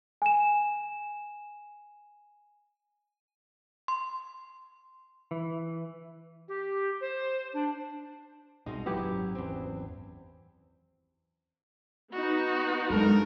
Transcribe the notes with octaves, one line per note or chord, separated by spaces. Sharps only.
G#5 E7
C6
E3
G4
C5
D4
C2 B2 G#3 D#4
D#1 A1 F#3 B3 E4 G4
G#1 F#2
E2 C4
B3 D#4 F#4
G2 F#3 G#3 A4 A#4